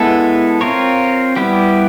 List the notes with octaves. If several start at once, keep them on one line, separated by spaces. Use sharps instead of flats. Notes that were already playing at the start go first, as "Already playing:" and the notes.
Already playing: G#3 B3 E4 A4
C4 F4 A#4 C#5
G3 B3 E4 G4